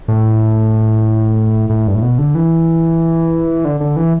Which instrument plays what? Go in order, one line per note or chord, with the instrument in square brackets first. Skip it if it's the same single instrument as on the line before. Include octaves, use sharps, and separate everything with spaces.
[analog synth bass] A2
A2
G2
A2
B2
D3
E3
D3
D3
E3